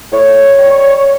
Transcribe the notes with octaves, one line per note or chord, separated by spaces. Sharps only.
A2 C#5
G3